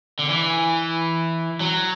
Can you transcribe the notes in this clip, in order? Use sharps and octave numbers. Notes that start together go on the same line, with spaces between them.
D3
E3
F#3